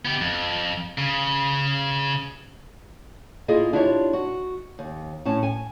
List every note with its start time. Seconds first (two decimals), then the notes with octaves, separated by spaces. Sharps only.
0.05 B3 G4
0.21 F2
0.98 C#3
3.48 A#3 E4 F4 G#4 D#5
3.73 D4 E4 F4 G4 C#5
4.13 F#4
4.79 D#2
5.25 A2 C#4 A5
5.43 G#5